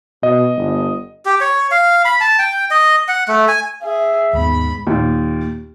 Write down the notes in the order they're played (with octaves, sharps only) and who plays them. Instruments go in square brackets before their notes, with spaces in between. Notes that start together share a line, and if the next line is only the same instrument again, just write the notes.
[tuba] B2 [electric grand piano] D#5
[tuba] G1
[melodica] G4
C#5
F5
B5
A5
G5
D#5
F#5
A3
G#5
[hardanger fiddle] G#4 [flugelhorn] E5
[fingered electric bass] D#2 B3 [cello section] G#2 [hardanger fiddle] B5
[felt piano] D#2 A#2